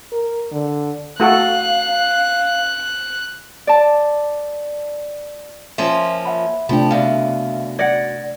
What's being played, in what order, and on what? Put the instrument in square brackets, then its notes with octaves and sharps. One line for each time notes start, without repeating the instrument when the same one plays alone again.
[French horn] A#4
D3
[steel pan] A3 F#4 A4 [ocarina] F5 [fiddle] F#6
[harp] D5 A5
[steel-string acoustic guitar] F3 A#3 C#4 [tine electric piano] E5 C6
[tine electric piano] E5 F#5 B5
[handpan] C3 A3 D4 [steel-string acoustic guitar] F3 G4 [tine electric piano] G5 B5
[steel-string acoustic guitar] F#2 B2 [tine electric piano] D5 E5 F5
[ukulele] D5 F#5 [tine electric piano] G#6 A#6